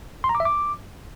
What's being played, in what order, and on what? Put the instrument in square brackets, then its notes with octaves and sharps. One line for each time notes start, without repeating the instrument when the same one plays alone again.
[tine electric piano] C6
A#5
D6
E5
D6